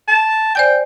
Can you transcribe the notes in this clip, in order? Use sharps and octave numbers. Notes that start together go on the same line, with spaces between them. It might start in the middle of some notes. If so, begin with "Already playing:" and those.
A5
C5 D5 G5 G#5